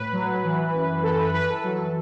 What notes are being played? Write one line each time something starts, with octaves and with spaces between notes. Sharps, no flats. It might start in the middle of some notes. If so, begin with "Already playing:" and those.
Already playing: A2 B4
F#3
E3
F#2
E3 A4
B4
E3 B4
A4
F#3